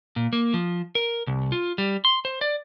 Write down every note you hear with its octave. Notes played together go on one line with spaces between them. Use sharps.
A#2
A#3
F3
A#4
C2
F4
G3
C6
C5
D5